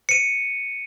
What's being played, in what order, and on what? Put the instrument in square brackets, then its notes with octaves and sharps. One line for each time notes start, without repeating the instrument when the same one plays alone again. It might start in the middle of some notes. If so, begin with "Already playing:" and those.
[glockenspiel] C#7 D#7